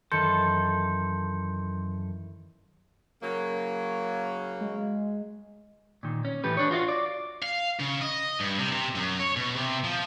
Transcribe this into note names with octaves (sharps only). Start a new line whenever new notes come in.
F#2 D#3 E3 A4 C6 G6 C#7
C#3 F#3 A#3
G#3
A#2 D#3
C#4
A2 E3 A3 G4 B4
D4 C#5
F4 F#4 D5 F5
D5
F5
C#3
D#5
G2
C3
C3
F#2
C#5
B2
C3
F3